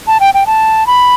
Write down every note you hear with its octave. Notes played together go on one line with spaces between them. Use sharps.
A5
G5
G5
A5
B5